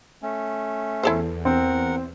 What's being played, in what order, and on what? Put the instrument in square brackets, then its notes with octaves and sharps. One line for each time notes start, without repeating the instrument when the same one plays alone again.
[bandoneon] A3 C#4
[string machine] E2 [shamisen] E4 A4 C5
[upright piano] C4 [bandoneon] A#4 F#5